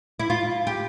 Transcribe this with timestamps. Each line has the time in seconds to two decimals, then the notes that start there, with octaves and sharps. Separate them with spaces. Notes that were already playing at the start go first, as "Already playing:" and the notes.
0.20 E4
0.30 F4
0.67 G4